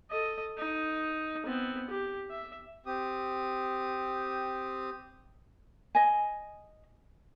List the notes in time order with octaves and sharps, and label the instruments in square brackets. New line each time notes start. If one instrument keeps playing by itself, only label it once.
[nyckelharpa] A4 D#5
D#4
B3 C4
G4
E5
[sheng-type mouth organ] C4 G4 D#6
[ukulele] D#5 G#5